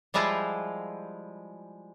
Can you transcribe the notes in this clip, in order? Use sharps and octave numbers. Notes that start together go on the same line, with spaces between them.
F3 G3 G#3 E4 F4